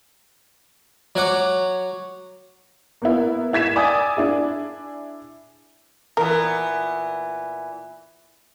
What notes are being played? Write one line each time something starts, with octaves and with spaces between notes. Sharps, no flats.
F#3 C#5 F#5 D6
A#3 B3 E4
E4 G#6 B6 E7
D5 G#5 D#6 E6
D4 E4 G#4
A#2 E3 B3 A#4